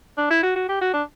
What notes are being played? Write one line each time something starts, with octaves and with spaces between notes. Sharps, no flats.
D4
E4
F#4
F#4
G4
F#4
D4